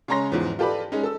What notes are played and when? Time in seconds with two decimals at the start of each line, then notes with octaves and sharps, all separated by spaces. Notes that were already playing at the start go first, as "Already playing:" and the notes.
0.08 C#3 G#3 C#5 A#5 C6 A#6
0.32 E2 G#2 F3
0.59 F4 G4 A4 B4 D5 B5
0.92 G#3 C#4 D#4
1.03 A4 E6